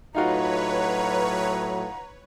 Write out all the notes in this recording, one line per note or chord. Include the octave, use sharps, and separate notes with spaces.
A2 F#3 D#4 F4 F#4 B4 C#5 A#5